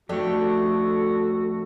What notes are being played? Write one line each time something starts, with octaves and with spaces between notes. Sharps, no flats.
F2 A2 A3 D4 F#4 G4 A4